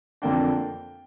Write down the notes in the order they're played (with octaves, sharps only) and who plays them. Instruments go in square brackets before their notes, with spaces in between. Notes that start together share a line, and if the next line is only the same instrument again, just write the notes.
[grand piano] F2 D3 A#3 D4 G5